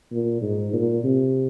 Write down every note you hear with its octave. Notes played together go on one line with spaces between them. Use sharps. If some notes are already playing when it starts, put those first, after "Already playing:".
A#2
G#2
A#2
C3